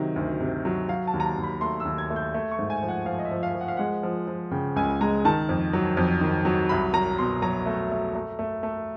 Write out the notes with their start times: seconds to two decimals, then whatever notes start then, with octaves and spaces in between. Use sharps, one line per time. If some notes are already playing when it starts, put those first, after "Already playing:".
Already playing: C3 D#3 F#3
0.16 D2
0.40 C3
0.65 F#3
0.89 F#3 F5
1.07 A5
1.13 D#2
1.20 A#5
1.24 A5
1.37 D#2
1.43 B5
1.61 A3 C6
1.80 E6
1.85 D#2
1.98 G#6
2.10 A3
2.16 G6
2.34 A3
2.51 C#6
2.59 G#2
2.70 G#5
2.83 F3
2.88 F#5
3.06 F3 F5
3.19 D#5
3.25 E5
3.31 F3
3.43 F5
3.55 F3
3.61 F#5
3.68 F5
3.77 G#3 F#5
4.03 F3
4.27 F3
4.51 C#3 G5
4.76 C#2 G#5
5.01 G#3 A#5
5.25 D#3 A5
5.49 F2
5.73 F#3
5.97 F2
6.21 D#3
6.45 F#3
6.69 C2 B5
6.93 F#3 A#5
7.18 B2 C6
7.42 F#3 A#5
7.66 A3
7.92 A3
8.15 A3
8.39 A3
8.63 A3